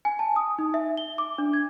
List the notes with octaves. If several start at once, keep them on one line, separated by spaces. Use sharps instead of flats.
G#5
A5
D#6
D#4
E5
G7
D6
D4
G#6